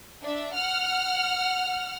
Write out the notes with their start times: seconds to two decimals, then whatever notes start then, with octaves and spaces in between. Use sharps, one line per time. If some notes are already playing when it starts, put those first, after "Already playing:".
0.23 D4 E5
0.54 F#5 F6